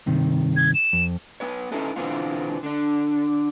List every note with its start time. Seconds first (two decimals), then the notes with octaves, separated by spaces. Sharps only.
0.06 G2 C3 D#3
0.56 G#6
0.74 E7
0.93 F2
1.40 B3 B4 C#5
1.72 C#4 D#4 E4 A4 B4
1.96 B2 D3 E3 B3 C4 F4
2.63 D3 D4